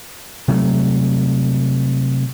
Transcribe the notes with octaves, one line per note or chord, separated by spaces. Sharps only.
C3 F#3 A3